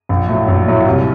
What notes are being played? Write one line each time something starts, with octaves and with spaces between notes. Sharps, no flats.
A#1
A2 F#3 A3
A#1
A2 F#3 A3
C2